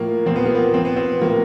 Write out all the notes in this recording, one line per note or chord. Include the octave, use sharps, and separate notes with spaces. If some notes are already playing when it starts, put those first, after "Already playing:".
Already playing: A2 F3 A#3
A#2 F3 C4
B3
A#3
B3
A#2 F3 C4
B3
C4
A2 F3 A#3